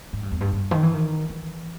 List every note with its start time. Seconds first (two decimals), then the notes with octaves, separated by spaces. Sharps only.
0.13 G#2
0.23 G2
0.31 E2
0.41 G2
0.52 G2
0.71 D#3
0.83 E3
0.94 D#3
1.29 E3